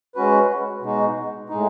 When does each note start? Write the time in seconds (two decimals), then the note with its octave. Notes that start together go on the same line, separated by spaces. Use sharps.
0.15 G#3 C#4 F#4 B4
0.82 B2 G#3 D#4 F#4
1.50 A2 G#3 D#4